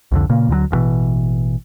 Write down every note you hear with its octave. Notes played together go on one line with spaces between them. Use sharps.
C2 F2 D3
A#2 C#3 A#3
D2 D3 D#3 F#3
A1 G2 B2 E3